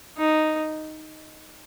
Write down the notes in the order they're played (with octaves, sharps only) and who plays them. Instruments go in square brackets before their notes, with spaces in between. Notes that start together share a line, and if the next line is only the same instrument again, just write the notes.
[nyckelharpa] D#4